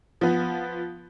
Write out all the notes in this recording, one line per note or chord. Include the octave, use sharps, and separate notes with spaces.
F3 B3